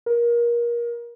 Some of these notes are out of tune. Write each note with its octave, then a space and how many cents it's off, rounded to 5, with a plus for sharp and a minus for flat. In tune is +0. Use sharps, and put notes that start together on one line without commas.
A#4 +25